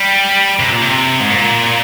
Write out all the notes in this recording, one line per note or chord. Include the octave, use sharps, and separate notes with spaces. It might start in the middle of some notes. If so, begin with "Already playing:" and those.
Already playing: G3
C3
A#2
C3
G#2
A#2